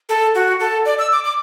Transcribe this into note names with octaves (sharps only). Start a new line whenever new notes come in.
A4
F#4
A4
D5
E6
D6
D6